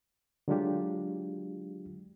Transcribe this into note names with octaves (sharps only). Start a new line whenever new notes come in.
D3 F#3 G#3 D4 F4 G4